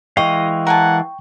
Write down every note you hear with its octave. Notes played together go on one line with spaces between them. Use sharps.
E3 G#3 D#5 F5 G5 C#6
A#4 F#5 G#5 A5